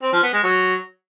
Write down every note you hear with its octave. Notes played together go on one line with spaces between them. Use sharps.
C4
F3
B3
G#3
F#3